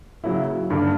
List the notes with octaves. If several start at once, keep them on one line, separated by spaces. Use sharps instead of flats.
C#3 F#3 A#3 E4
G2 D3 A#3